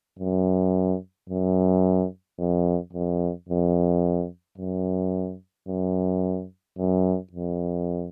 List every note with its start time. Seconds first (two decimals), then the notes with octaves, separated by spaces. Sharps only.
0.19 F#2
1.29 F#2
2.39 F2
2.93 F2
3.49 F2
4.58 F#2
5.68 F#2
6.78 F#2
7.33 F2